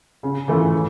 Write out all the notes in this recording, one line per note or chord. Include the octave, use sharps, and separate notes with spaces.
C#3
E3 A3 C#4 F4
E3